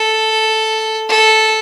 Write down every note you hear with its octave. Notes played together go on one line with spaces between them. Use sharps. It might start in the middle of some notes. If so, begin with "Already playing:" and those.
Already playing: A4
A4